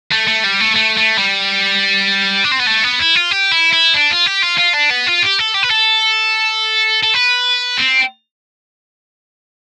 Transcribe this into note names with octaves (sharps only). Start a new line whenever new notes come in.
A3
A3
G3
A3
A3
A3
G3
D4
C4
B3
A3
B3
E4
F4
G4
E4
E4
D4
F4
G4
F4
F4
D4
B3
F4
G4
A4
G4
B4
A4
A4
B4
C4